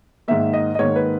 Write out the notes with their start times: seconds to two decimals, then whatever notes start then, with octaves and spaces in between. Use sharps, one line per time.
0.28 G#2 D#3 A#3 E5
0.53 D#5
0.75 D#5
0.79 G#2 D#3 A#3 C#5
0.96 B4